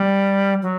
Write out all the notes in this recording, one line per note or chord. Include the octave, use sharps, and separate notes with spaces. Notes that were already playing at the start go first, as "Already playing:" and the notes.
Already playing: G3
F#3